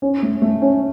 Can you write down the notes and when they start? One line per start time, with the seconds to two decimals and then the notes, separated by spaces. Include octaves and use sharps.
0.02 C#4
0.22 A3
0.42 A3
0.62 C#4